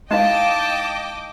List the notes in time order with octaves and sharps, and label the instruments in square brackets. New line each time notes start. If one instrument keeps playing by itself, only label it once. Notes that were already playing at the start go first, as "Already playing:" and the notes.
[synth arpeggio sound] G#3 [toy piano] D#4 E4 F5 [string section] D#5 G5 D6 [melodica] A5